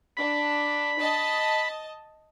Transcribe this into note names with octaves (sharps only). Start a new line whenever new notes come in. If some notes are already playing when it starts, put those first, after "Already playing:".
D4 B5
D#5 A5